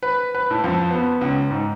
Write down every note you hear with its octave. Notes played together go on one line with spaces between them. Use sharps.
B4
B4
A2
F2
B3
C#2
G#2